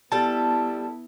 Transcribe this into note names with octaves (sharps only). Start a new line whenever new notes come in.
G3 B3 E4 A4 A5